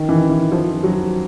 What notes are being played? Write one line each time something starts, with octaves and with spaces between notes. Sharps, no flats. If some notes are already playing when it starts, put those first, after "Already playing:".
Already playing: D#3
E3
E3
F3
F#3